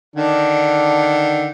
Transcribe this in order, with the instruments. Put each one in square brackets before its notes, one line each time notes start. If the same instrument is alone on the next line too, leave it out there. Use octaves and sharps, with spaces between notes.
[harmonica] D3 D#3 D4